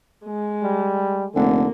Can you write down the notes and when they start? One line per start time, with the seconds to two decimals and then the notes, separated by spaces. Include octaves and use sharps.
0.25 G#3
0.63 G3
1.35 F1 D3 A#3